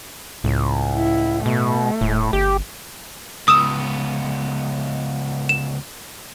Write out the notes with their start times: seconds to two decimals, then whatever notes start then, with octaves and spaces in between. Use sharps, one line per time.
0.44 C#2 A2
0.94 E4
1.46 B2 A3
2.01 D#1 A2
2.33 G1 G4
3.48 C#2 B3 D#6 E6 E7
5.49 E7